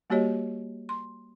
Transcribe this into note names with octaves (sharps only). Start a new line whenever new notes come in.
G3 A#3 F#4 G4 C#5 D#5
C6